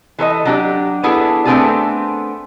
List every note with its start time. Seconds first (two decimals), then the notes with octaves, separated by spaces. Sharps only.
0.18 E3 A4 C5 D#5
0.45 F#3 D4 G4
1.03 B3 D4 E4 G#4 A4
1.45 A3 B3 C4 D4 G#4 A4